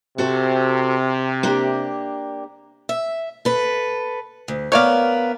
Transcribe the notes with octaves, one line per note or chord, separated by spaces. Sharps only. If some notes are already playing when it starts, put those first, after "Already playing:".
C3 F#4 A4 C5
A#3 D4 G4
E5
A4 B4
D2
B3 A#4 C#5 D5 F5